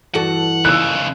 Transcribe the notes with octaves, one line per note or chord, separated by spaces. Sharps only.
G2 E3 F#4 A4 F#5
D#2 C#3 E6 F#6